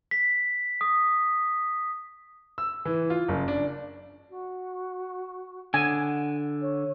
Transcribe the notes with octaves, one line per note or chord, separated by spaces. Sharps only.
B6
D#6
E6
E3
F4
F#1
D4
F#4
D3 F#5 G#5
C#5